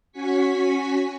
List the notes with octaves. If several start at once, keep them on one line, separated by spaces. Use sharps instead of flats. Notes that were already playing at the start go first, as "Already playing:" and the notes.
C#4 F#4 G#5 C#6 B6